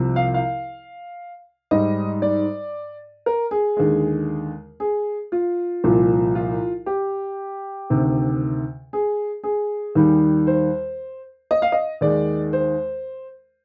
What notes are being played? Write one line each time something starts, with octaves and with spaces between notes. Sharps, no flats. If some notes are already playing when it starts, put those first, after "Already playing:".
Already playing: C2 C3 F3
F5
F5
G#2 G3 D#5
D5
A#4
G#4
D#2 D3 G#3
G#4
F4
C2 A#2 F3
F4
G4
D2 C3 D#3
G#4
G#4
D#2 D#3 G3
C5
D#5
F5
D#5
D#2 D#3 G#3 D5
C5